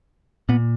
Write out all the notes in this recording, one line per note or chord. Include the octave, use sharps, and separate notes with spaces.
A#2 B3